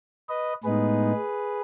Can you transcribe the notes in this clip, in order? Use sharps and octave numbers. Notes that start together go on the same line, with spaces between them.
B4 D#5
A2 G#3 B3 D#4 G#4 B4